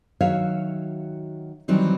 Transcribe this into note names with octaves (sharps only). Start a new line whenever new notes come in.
D#3 F#3 F#4 C#5 E5 F5
D#3 E3 F#3 G3 C4 D#4